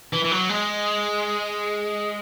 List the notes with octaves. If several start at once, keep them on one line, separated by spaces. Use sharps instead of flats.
E3
E3
F#3
G#3